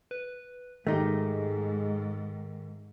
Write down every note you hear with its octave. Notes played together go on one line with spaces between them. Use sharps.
B4
G#2 D#3 G#3 A3 D#4 G4